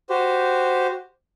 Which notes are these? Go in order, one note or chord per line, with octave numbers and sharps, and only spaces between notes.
F#4 G4 C5